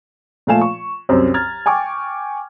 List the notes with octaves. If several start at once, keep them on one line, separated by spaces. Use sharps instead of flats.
A#2 F3 A3 F5 G#5 E7
C#6
C2 F#2 C4 C5
A#5 F6 G#6 A6
G5 G#5 C#6 D6